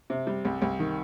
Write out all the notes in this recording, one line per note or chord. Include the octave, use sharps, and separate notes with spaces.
C3
G3
C2
C2
D#3